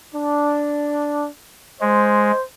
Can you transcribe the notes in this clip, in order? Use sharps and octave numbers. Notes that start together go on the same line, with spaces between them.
D4
G#3 C5